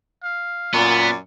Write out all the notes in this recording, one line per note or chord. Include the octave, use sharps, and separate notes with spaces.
F5
F#2 A#2 B3 D5